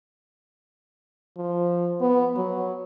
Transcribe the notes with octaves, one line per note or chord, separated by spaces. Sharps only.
F3
B3
F#3